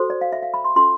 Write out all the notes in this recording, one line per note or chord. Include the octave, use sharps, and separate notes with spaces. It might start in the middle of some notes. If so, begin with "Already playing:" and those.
Already playing: F#4 A4 C5
D5
F5
E5
F5
B5
C6
C#4 F4 A4 C6